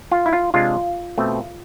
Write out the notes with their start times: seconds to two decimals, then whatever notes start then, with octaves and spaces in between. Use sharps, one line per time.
0.11 F4
0.26 E4
0.33 F4
0.54 C3 G#3 D4 F4
1.18 B2 A3 C4